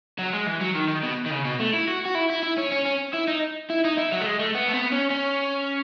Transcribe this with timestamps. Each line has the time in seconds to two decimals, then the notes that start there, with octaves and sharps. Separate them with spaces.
0.19 F#3
0.33 G#3
0.46 E3
0.61 F#3
0.75 D#3
0.88 D#3
1.03 B2
1.26 D#3
1.31 C#3
1.45 B2
1.60 A3
1.73 E4
1.88 F#4
2.05 F#4
2.15 E4
2.30 E4
2.43 E4
2.58 C#4
2.72 C#4
2.86 C#4
3.14 E4
3.28 D#4
3.70 E4
3.84 D#4
3.98 E4
4.12 F#3
4.21 A3
4.26 G#3
4.39 A3
4.54 B3
4.68 A3
4.73 B3
4.92 C#4
5.10 C#4